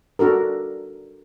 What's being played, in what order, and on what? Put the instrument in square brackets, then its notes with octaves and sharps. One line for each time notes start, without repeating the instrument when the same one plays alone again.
[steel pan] D4 F#4 A4 A#4